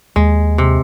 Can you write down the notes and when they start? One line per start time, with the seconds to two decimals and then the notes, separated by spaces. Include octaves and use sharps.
0.16 D#2 G#3
0.58 C3